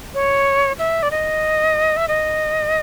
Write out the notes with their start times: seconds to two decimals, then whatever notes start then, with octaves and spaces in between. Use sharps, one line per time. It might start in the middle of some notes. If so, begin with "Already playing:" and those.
0.14 C#5
0.79 E5
1.03 D5
1.11 D#5
1.97 E5
2.08 D#5